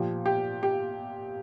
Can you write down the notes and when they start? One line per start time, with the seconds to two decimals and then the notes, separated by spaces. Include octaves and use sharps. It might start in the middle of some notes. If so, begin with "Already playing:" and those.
Already playing: A#2 F3 G4
0.26 G4
0.63 G4